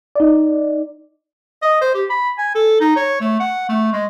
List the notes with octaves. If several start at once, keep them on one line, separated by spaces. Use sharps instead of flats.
D#4 D5
D#5
C5
G4
B5
G#5
A4
D#4
C#5
A3
F#5
A3
G#3